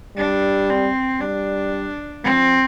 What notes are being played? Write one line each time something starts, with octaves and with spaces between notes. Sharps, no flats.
G3 D4
C4
G3 D4
F3 C4